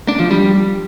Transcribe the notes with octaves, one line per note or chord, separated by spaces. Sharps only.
D4
F3
G3